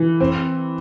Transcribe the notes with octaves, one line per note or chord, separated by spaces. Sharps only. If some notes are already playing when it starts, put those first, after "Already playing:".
Already playing: E3
C4